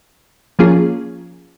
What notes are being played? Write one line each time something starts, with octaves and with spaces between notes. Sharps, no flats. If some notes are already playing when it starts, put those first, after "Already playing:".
F3 A#3 C#4 F4 G#4